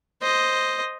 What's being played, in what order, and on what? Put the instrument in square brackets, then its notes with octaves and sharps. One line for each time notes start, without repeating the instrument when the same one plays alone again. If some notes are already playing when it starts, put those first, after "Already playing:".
[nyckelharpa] C5 D#5